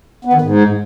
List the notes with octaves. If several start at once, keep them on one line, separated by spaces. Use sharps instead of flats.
B3
D#3
G#2